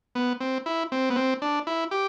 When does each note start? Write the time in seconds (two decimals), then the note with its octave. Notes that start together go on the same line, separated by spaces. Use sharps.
0.15 B3
0.40 C4
0.66 E4
0.92 C4
1.10 B3
1.16 C4
1.42 D4
1.67 E4
1.91 G4